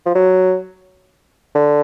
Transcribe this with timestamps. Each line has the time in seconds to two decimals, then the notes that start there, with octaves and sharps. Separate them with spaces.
0.06 F3
0.15 F#3
1.55 D3